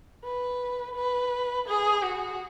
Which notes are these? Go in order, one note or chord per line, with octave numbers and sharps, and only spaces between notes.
B4
B4
G#4
F#4